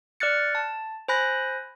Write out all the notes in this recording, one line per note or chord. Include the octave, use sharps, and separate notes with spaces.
D5 F6 F#6 A6 C#7
A5
C5 G#5 B5 F#6 A#6